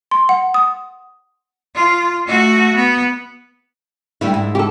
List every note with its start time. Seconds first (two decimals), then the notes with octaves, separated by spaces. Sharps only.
0.11 C6
0.29 F#5
0.54 D#6
1.75 F4
2.26 A3 F#4
2.75 B3
4.21 D3 G3 A3 E4
4.34 G#2
4.55 G4 A4